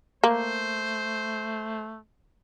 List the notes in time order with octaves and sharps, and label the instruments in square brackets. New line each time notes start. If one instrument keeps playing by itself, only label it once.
[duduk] A3 [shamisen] A#3 [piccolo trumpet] C5